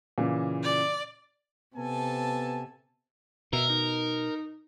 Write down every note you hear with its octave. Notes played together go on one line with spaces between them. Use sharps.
A#2 C#3 E3
D5
C3 B3 A4 G#5 A5
B2 A#4 E5
D#4